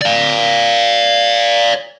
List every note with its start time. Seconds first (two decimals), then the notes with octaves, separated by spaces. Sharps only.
0.02 D5 F5